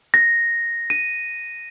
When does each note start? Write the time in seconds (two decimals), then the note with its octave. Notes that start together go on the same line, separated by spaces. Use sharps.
0.14 A#6
0.90 D#7